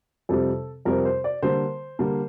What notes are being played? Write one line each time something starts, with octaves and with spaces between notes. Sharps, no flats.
F2 C3 G3 C4 A4
F2 C3 G3 C4 A#4
C5
D5
D3 G3 A#3 C5
D3 G3 A#3